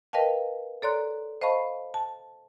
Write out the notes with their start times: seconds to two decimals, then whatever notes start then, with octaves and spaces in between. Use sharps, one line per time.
0.13 A#4 B4 D#5 F5 G5 A5
0.82 A4 C#5 D5 A#5 C6 F#6
1.42 C5 D#5 F5 A5 B5 C#6
1.94 A5